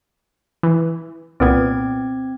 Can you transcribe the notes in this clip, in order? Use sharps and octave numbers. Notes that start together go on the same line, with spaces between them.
E3
C2 A#2 B3 C4 G#6